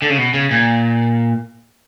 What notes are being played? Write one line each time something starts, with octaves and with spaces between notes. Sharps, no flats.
D3
C#3
B2
C#3
A#2